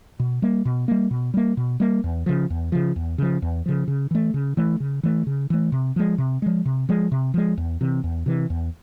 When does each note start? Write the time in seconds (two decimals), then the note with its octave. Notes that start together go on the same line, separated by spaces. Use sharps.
0.20 B2
0.42 G3 A#3
0.65 B2
0.88 G3 A#3
1.11 B2
1.34 G3 A#3
1.57 B2
1.80 G3 A#3
2.04 E2
2.26 C#3 F3
2.50 E2
2.72 C#3 F3
2.96 E2
3.18 C#3 F3
3.42 E2
3.66 C#3 F3
3.88 C#3
4.11 E3 A3
4.34 C#3
4.57 E3 A3
4.80 C#3
5.03 E3 A3
5.27 C#3
5.50 E3 A3
5.72 C3
5.96 F3 G#3
6.18 C3
6.42 F3 G#3
6.65 C3
6.89 F3 G#3
7.12 C3
7.34 F3 G#3
7.57 E2
7.81 C3 E3
8.04 E2
8.26 C3 E3
8.50 E2